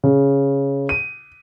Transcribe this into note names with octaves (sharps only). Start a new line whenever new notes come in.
C#3
D#7